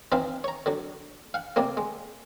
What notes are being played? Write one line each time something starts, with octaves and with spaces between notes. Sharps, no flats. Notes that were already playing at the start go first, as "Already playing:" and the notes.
E3 C4 D#4 C5 F5 C6
C#5 A#5
D3 F#3
F5 F#5
C3 G3 A#3 C4
G#3